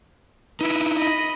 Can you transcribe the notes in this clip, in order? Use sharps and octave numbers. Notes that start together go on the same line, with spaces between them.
D#4 E4 B4
D#5 B5